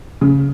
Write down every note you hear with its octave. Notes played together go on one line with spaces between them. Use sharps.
C#3